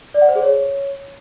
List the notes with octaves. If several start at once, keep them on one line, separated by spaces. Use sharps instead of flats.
D5
F#5
C5
G#4
C#5